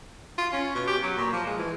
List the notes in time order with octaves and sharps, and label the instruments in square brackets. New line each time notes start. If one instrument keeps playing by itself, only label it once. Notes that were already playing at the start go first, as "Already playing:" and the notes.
[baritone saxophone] F4
C#4
B2
G4
F#3
A#2
F3
G#3
E3